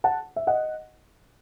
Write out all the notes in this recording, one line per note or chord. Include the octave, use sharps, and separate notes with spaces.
F#5 A5
E5
D#5 F#5